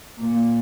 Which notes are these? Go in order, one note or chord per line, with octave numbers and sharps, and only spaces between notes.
A#2